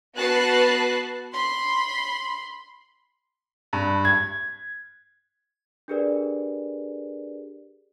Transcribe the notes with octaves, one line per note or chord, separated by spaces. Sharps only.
B3 F#4 B4 A5 F#6 C7
B5 C6
G2
G#6
D4 G4 G#4 A#4 B4 D5